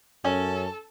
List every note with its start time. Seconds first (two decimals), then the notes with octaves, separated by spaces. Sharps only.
0.25 F#2 C#4 A4